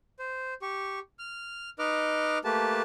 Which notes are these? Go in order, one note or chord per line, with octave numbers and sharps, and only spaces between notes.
C5
G4 C#6
F6
D#4 B4 D#5 D6 F6
A3 A#3 G4 B4 A5